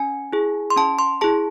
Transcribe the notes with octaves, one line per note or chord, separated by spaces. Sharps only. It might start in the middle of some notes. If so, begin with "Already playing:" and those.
Already playing: C#4 G#5
E4 G#4
C6
C#4 A5
C6
E4 G#4 A5